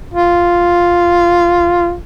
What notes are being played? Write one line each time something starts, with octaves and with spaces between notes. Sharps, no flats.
F4